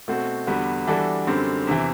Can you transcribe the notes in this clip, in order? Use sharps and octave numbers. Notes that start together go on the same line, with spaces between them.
B2 A3 C4 F#4
E2 D3 G3 B3 F#4
E3 G3 D4 F#4 A4
F#2 D3 G3 C4
E2 C3 E3